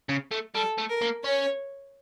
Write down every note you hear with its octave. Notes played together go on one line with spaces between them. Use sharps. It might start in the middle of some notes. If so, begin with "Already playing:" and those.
C#3
A3
G3 A4
A3
A#4
A#3
C#4 C#5